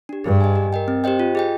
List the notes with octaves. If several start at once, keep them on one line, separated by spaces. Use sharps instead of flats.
D4 G4
G2 G#4
D#5 G#5
G4
A#4 D#5 G5
C4
G4 C5 D#5 G5
F4
G#4 D#5 G5